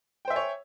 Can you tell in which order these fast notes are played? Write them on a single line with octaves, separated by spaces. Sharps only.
G5 C5 E5 G#5 C#5